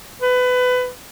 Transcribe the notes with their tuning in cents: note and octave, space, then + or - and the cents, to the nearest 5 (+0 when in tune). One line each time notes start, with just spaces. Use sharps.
B4 +20